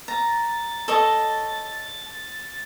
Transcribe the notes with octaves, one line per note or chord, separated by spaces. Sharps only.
A#5 A6
A4 C#5 D#5